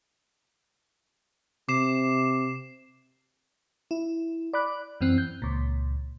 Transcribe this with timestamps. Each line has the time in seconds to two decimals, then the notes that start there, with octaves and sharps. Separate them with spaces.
1.69 C3 D6 C7 E7
3.91 E4
4.53 D5 B5 D6 F#6
5.01 F#2 E3 C4 F#6
5.18 G6
5.42 C#2 A#2